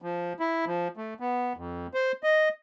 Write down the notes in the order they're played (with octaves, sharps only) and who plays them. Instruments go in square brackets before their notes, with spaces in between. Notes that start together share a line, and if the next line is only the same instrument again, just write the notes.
[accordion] F3
E4
F3
A3
B3
F2
C5
D#5